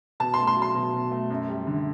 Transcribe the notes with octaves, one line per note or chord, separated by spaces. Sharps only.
B2 A5
A3 C6
C6
F#3
C6
B2
B2
A3
F#2
G3
D3